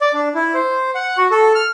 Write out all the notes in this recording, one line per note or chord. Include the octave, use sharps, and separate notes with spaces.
D5
D4
E4
C5
F#5
F#4
A4
F6